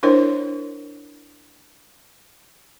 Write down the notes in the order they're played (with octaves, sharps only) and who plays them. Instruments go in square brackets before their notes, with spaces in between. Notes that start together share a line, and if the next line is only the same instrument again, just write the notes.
[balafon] D4 E4 A#4 C5 C#5